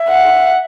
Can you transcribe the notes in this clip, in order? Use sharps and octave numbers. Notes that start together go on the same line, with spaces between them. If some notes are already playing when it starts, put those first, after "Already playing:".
Already playing: E5
F#5